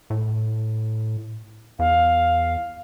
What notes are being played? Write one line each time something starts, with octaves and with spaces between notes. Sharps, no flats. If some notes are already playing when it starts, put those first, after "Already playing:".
A2
E2 F5